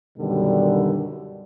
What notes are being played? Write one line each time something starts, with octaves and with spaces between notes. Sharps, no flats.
F#2 B2 D3 D#3 G3